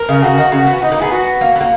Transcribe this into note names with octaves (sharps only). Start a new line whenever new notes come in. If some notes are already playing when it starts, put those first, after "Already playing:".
Already playing: A#4
C#3
C#3 F#4
D#3
C#3
B3
B3 D#4
A#3
B3 G#4
F#4
A#3
B3
A#3